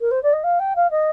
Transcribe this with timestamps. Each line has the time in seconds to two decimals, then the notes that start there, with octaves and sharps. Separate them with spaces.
0.01 A#4
0.11 C5
0.23 D5
0.33 D#5
0.43 F5
0.59 G5
0.76 F5
0.91 D#5